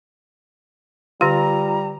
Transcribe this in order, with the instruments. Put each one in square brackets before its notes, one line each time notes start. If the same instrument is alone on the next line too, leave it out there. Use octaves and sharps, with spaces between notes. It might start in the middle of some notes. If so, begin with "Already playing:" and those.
[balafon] D3 G4 [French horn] G3 [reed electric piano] F4 [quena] A#5